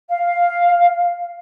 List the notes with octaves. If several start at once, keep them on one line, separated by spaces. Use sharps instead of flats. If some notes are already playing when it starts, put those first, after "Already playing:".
F5